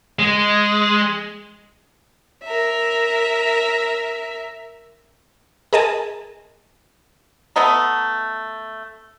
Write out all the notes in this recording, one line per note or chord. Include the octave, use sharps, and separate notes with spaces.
G#3
A#4 E5
G#4 A#4 D#5 G#5 A5
A3 B3 D#5 A#5